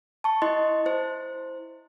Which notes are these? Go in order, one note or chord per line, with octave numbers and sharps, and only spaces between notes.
A5 C#6
E4 D#5 C6
E4 C5